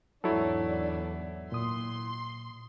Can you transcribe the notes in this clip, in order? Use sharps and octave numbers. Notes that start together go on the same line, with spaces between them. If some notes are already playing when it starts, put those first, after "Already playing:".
E2 G#2 F#3 D4 E4 A4 C#5
A#2 C6 D#6